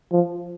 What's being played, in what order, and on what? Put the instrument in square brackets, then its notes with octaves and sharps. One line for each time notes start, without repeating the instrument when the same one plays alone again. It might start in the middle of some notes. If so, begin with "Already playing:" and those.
[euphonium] F3